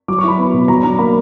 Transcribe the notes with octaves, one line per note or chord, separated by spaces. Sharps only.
F#3 D6
C#6
E4 B5
B3
B2
F#3 A#5
D4 A#5
A#3 B5